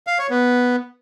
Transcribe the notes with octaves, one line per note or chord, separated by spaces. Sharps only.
F5
C#5
B3